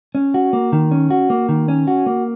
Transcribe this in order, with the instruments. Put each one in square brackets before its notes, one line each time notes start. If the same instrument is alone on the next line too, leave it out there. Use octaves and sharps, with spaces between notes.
[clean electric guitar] C#4
F#4
A#3
D#3
C#4
F#4
A#3
D#3
C#4
F#4
A#3